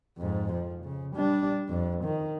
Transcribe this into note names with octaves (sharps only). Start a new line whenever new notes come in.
F2 G#2
F3
C#3
G3 D4
F2
D#3